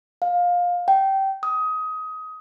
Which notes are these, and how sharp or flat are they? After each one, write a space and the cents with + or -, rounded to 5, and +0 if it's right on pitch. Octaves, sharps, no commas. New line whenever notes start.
F5 +20
G5 -20
D#6 +20